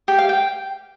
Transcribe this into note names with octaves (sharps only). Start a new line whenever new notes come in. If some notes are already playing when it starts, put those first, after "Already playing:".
G4
F5
G5